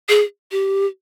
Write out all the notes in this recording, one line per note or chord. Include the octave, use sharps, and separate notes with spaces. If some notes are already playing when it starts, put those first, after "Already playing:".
G#4
G4